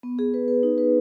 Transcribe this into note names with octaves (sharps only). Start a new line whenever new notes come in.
B3
G#4
B4
B4
D#4
B4